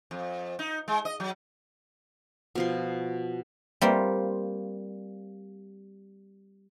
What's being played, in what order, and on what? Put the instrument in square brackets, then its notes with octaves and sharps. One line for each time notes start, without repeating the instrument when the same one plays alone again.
[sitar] F2
D#4
G#3
D#5
F#3
[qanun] B2 F3 C6
[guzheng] G3 A#3 C4 F4